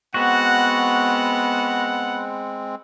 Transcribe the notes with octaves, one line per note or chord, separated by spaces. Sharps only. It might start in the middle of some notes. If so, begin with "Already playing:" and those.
G#3 B3 C4 F#4 F#5